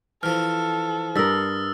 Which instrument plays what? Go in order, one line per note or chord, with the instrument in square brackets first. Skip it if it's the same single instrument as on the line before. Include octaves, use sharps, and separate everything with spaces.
[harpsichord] E3 F3 [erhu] A4 [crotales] F6
[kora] G2 A#4 [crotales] D#6 E6 A6